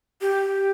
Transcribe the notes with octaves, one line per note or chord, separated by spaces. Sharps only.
G4